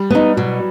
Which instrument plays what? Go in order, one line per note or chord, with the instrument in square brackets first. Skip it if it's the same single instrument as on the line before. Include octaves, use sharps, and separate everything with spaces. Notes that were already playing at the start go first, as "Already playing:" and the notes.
Already playing: [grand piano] G3
[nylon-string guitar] B3 D#4
[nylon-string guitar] B2 [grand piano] F#3